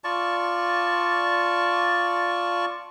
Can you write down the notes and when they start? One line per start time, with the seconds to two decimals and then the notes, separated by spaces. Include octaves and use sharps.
0.04 F4 D5 A5 C#6